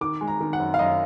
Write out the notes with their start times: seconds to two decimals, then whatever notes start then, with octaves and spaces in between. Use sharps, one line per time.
0.01 D#3 D6
0.21 G#3
0.28 A#5
0.41 D#3
0.53 F#5
0.60 F#2
0.74 F5
0.79 F#2 D#5